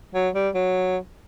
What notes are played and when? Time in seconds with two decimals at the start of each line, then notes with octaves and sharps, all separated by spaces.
0.14 F#3
0.35 G3
0.54 F#3